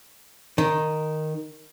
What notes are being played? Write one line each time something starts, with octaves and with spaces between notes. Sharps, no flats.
D#3